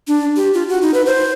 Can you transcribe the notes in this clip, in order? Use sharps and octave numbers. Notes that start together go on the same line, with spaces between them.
D4
G4
F4
F#4
D#4
B4
C5